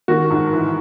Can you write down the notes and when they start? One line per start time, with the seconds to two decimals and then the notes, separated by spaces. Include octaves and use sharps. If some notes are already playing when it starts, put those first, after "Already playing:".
0.08 D#3 F#4
0.30 G#2
0.53 E3